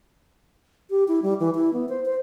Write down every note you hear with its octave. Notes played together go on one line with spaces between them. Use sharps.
G4
E4
G3
E3
E4
B3
C5
C5